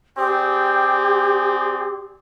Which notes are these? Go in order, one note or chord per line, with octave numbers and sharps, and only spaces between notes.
C4 G4 G#4 D5